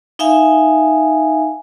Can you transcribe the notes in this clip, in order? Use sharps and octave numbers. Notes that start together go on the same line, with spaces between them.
D#4 E5 F5 G#5